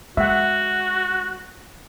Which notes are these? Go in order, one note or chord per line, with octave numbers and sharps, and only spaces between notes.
G#3 F#4 E5 F#5